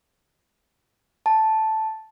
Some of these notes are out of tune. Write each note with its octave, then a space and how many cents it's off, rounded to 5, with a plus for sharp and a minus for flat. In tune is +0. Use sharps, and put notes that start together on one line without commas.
A5 -5